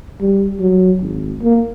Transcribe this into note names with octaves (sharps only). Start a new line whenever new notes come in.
G3
F#3
G#1
A#3